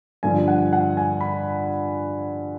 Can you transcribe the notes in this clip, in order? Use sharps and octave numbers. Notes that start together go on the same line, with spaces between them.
G2 D3 F3 G#5
F#5
F#5
G#5
B5